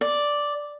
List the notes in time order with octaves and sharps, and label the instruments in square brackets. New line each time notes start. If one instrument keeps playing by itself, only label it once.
[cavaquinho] D5